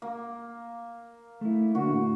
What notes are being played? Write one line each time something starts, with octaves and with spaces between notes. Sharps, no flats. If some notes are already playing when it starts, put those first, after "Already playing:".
A#3
A3 E4
D3 A#3 D4 F#4
A2